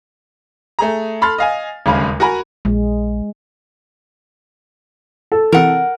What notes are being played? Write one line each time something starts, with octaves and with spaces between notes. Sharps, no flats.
A3 G#4 A#5
A4 B5 C6 F6 A6
D#5 F5 G#5
D#1 D2 C#3 G#3 F5 B5
F#4 A#4 F#5 G#5 A#5 B5
A#1 G#3
A4
C3 E3 A#4 F#5